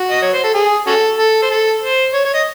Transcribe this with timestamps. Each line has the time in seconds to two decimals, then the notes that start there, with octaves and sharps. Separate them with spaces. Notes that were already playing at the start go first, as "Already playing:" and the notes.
Already playing: F#4
0.11 D#5
0.22 C#5
0.34 C5
0.44 A4
0.54 G#4
0.87 C#4 F#4 A4
1.18 A4
1.42 C5
1.51 A4
1.82 C5
2.14 C#5
2.25 C#5
2.34 D#5